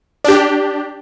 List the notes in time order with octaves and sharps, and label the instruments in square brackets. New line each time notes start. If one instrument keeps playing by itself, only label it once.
[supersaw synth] D4 G4